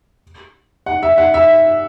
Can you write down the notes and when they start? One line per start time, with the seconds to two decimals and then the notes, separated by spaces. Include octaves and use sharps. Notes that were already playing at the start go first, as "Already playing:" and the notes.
0.86 F#5
1.03 E5
1.18 F#5
1.34 E5